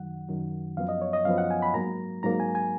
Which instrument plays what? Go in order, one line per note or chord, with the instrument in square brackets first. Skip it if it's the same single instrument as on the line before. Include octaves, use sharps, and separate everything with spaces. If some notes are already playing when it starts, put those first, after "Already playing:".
Already playing: [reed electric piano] F#2 D#3 F#3 F#5
F#2 D#3 F#3
F#2 F3 B3 F5
D#5
C#5
D#5
F#2 F3 B3 F5
F#5
G#5
B5
G#2 F#3 A#3 A#5
G#2 F#3 A#3 A#5
G#5
G#5